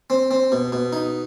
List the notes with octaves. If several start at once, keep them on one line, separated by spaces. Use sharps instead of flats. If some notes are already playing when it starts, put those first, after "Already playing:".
C4
C4
B2
B2
D#4